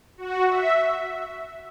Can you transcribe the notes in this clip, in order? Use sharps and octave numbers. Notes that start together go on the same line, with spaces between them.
F#4
E5